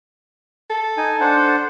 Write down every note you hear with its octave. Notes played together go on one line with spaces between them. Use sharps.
A4
D#4 G#5
D4 C5 F#5